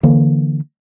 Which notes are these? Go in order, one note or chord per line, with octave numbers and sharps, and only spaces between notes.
D3 E3 A#3